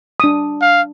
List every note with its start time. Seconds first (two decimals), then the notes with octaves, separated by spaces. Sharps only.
0.20 D4 D#6
0.62 F5